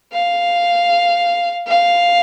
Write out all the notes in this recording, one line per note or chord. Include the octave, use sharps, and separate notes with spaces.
F5
F5